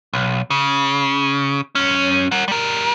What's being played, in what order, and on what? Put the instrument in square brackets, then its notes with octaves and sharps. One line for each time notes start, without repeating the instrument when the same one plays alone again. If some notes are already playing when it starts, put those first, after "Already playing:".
[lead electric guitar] B1
C#3
F#2 C#4
A#4 F#5
G3 A#4